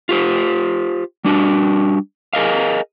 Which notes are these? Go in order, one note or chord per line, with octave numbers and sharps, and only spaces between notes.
F4 G4 C5
G3 D4 F#4
G#4 A#4 D#5 F5